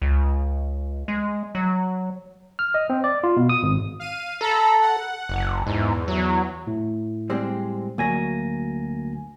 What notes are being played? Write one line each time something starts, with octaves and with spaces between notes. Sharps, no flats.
C#2
G#3
F#3
F6
D#5
C4
D5
F4
B2
D#6
G#1
F5 D#7
A4 A#5 B5
F#5
F#1
E2 G#2
F#3
A2
G3 G#3 C4
D2 F#3 A#3 G#5 A#6